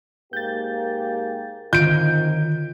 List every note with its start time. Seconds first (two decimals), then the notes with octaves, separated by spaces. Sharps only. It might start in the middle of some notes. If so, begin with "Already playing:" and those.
0.33 G#2 A#3 G4 G6 A6
1.73 F#2 D3 D#3 C4 D#4 F4 G6 D7